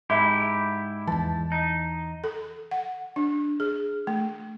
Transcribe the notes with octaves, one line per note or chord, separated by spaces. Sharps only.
G#2 E4 G4 E5 B5 D6
E2 E3 A5
D#4
A4
F#5
D4
G#4
A3